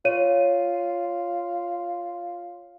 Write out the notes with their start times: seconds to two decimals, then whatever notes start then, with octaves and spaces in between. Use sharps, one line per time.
0.05 F4 C#5 D#7